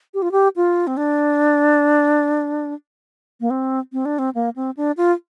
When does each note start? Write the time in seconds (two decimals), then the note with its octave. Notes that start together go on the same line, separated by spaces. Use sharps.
0.14 G4
0.22 F4
0.32 G4
0.56 F4
0.87 C4
0.97 D4
3.41 A#3
3.50 C4
3.93 C4
4.05 D4
4.19 C4
4.35 A#3
4.56 C4
4.77 D4
4.97 F4